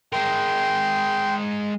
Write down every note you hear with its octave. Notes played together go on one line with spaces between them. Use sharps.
G#3 A#4 G5 C6